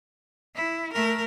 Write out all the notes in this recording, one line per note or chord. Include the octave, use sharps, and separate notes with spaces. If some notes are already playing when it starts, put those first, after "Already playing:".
E4
A3 A#4